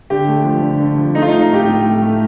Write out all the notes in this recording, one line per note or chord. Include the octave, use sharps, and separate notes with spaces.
D3 G4
A3
F3
D3
D3
F3
A3 D#4
F4
D#4
A3
D#4
A2 G4
A2
A2
A3